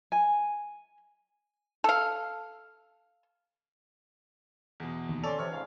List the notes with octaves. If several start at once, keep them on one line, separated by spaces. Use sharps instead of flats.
G#5
A4 F5
E2 B2
D#2
C#4 A4 C#5 D5 C6 F7
C3 E3 C#5 F6
C#2 G#2 F5